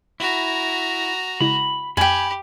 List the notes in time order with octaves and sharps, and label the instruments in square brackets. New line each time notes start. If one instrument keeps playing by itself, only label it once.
[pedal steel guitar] E4 [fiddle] F#4 A#5
[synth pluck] C#3 G#3 E4 [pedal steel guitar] B5
[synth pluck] F2 [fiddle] G4 [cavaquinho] G5 G#5 [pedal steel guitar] B5